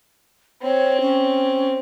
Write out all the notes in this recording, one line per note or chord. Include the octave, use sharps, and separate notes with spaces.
C4 C#5
C#4